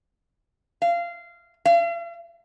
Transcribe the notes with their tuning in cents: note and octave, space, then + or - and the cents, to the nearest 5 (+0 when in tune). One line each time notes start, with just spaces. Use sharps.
F5 -20
F5 -45